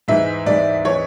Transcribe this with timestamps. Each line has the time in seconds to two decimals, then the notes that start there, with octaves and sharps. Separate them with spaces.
0.08 G#2 E3 G#3 E5
0.46 G#2 E3 G#3 D5
0.84 E3 G#3 C#5